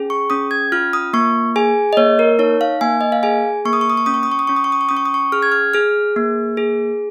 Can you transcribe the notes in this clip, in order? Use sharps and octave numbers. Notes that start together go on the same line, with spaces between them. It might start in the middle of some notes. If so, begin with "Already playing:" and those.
Already playing: C#4 G#4
C#6
C#4 D#6
G#6
F4 F6
D#6
A#3 C#6
G#4 G#5
D#5
A#3 C#5
A#4
D#4 C#5
F5
A#3 G#5
D#5
F5
G#4 G#5
A#3 C#6
D#6
C#6
D#6
C#6
C#4 D#6
C#6
D#6
C#6
D#6
C#4 C#6
D#6
C#6
D#6
C#6
C#4 D#6
C#6
D#6
C#6
G#4 F6
G#6
F6
G#4 F6
A#3
G#4